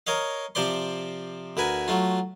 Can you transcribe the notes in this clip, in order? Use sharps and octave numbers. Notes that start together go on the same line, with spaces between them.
A#4 C#5 D#5 F5
C3 F3 C5 D5 C6
D2 A#4 B4 G#5
F#3 A3 F4